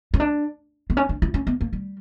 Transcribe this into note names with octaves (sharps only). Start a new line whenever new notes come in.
C#4
D4
B3
C#4
D4
E4
C#4
B3
A#3
G3